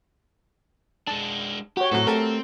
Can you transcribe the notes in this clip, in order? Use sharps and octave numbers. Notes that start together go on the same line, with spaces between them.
G#3 D4 A5
F#4 G4 C#5
A2 F#3 C4 A4
A3 C4 G4 A4 A#4